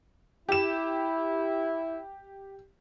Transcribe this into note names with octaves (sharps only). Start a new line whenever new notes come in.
E4 G4 E7